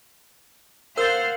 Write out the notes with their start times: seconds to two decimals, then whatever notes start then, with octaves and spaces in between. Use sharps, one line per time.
0.97 A#4 C5 F5 F#5 E6 A6